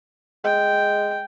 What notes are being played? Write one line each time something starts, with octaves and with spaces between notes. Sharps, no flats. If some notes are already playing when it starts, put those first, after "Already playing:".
G#3 G5